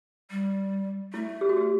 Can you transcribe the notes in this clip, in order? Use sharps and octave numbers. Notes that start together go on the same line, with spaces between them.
G3
A3 E4
G4
F#4
G4